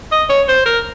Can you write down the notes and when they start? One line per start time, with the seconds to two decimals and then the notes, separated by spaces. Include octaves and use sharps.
0.12 D#5
0.30 C#5
0.48 C5
0.66 A#4